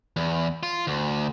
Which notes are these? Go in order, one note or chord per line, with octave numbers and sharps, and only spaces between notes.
E2
F4
D2